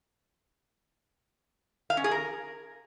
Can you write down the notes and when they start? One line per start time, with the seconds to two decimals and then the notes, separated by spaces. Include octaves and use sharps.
1.90 F5
1.97 C#4
2.04 G#4
2.11 A#4